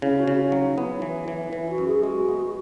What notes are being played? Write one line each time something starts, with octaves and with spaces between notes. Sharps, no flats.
C#3 E4
F#4
C#3
F#4
F#3 E4
D#4
B3 E4
E3
E3
E3
E4
F#4
F#2
G#4
G#3 F#4
B3